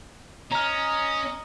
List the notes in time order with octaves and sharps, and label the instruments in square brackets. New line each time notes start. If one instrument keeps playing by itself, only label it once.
[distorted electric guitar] C#4 [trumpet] D#5 [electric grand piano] A#5 F6